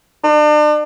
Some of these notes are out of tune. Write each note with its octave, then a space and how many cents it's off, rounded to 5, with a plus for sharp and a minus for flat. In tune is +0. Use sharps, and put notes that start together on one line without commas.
D4 +40